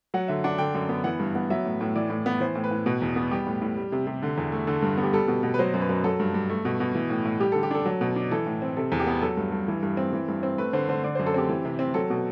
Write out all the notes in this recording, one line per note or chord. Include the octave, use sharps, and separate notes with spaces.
F#3 F#5
D3 E5
D4 F#5
D3 G5
F#2
B3
E3 F#5
G2
B3
F#3 E5
A2
A2
E3 D5
A2
B3
E3 C5
A2
B4
A2
B2 B4
E2
B3
G3 G4
A2
A2
G3
C3
C3
D3
E2
A3
D3 A4
G2
B3
G4
G3 A4
B2
B2
B4
F#3 C5
F#2
B4
F#2
F#3 A4
G2
G2
A3
B2
B2
E3
A2
A2
G3 G4
D3 A4
G4
D4 A4
F#3
B2
D4
E3 A4
A2
C4
C3 A4
E2
G4
B3
F#3 A4
G2
G2
E3
G2
C4
E3
G2
C4
A3 B4
D3 C5
D3 C5
D3 D5
F#2 C5
A4
C4 G4
E3
C3
C4
F#3 A4
B2